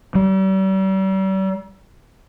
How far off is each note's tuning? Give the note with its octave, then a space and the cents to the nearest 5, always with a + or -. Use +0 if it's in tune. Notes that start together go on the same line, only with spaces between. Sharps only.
G3 -40